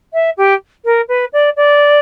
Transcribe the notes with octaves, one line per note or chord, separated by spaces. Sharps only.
E5
G4
A#4
B4
D5
D5